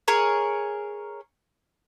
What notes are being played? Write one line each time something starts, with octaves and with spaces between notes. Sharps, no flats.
G#4 A#4 C#5